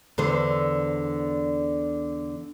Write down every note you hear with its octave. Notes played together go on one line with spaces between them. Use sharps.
E2 D3 C5